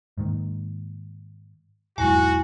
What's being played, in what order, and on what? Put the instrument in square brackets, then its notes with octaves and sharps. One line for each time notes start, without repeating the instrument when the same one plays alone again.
[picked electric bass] G#2 D#3 A#3
[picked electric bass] E1 B1 G#2 [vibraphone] E4 [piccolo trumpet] F#4 [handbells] G#5